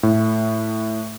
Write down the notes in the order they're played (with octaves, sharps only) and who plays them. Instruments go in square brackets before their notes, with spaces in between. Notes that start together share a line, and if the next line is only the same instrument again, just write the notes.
[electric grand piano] A2